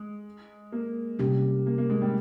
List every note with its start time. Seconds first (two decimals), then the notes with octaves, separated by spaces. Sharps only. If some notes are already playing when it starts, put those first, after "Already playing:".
Already playing: G#3
0.72 A#3
1.19 C3 G3 C#4 G4
1.66 A#3
1.78 A#3
1.89 G#3
2.02 G3